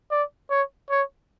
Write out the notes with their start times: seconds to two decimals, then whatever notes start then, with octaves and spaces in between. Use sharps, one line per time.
0.11 D5
0.50 C#5
0.90 C#5